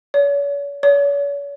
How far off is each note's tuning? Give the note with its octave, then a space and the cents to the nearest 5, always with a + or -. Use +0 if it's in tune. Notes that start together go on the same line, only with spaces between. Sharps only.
C#5 +40
C#5 +40